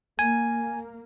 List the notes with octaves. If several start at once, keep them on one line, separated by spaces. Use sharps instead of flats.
A#3 G#5